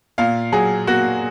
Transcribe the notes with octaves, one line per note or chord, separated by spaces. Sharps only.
A#2 F5
F#3 G#4
A#3 F#4